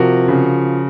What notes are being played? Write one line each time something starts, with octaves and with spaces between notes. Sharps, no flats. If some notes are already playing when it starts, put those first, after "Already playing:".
Already playing: C3 F3 F#4 A#4
C#3